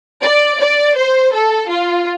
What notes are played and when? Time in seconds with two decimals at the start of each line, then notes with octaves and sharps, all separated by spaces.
0.23 D5
0.59 D5
0.97 C5
1.33 A4
1.69 F4